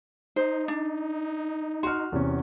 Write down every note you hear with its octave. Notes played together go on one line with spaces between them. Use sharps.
D#4 C5
D4
F#4 C6 F6
E2 C3 C#4